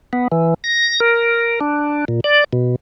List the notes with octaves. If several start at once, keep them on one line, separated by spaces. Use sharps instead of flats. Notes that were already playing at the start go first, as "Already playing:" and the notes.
B3
E3
A#6
A#4
D4
A#2
D5
B2